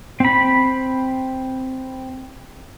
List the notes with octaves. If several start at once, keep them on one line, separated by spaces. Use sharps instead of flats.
C4 B5